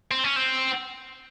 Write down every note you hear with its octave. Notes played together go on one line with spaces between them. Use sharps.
C4
C#4
C4